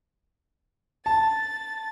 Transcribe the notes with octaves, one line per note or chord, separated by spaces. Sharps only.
A5 A6